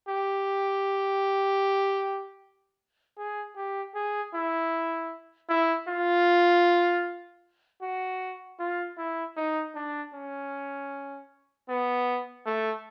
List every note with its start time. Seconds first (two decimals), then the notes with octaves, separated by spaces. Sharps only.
0.08 G4
3.17 G#4
3.56 G4
3.95 G#4
4.34 E4
5.49 E4
5.88 F4
7.82 F#4
8.59 F4
8.98 E4
9.37 D#4
9.75 D4
10.14 C#4
11.69 B3
12.46 A3